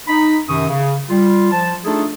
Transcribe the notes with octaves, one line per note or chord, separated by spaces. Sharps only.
D#4 B5
F#2 C3 D#3 C#6 D#6
C#3
G3 F4
F3 A5
A3 D4 D#4 F4 G#4 A4